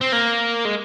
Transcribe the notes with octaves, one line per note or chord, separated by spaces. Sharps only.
C4
A#3
G#3